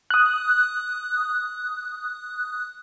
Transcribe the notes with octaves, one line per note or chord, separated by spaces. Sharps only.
D#6 F#6